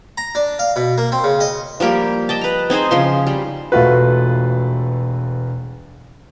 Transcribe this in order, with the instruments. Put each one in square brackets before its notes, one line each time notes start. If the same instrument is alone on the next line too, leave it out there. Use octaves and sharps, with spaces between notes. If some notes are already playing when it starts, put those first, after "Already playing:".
[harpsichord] A#5
D4
F5
B2
A#3
C4
C#3
D#5
[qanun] F3 G3 A#3 G4
D#5 G5 A5
B4 A#5
C4 D#4 G#4 C5
C#3 F3 C6
G3
[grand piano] E1 A3 F4 F#4 B4